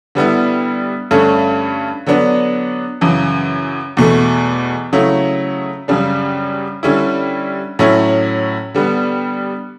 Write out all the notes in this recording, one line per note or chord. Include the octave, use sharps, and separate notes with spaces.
D3 G3 B3 E4
G2 D3 A3 C#4
D3 F#3 B3 D4
F#2 C#3 E3
E2 B2 A3
C#3 F#3 A3 E4
F#2 C#3 G3 D4
D3 G3 C#4 E4
A2 F#3 C#4 E4
D3 G3 B3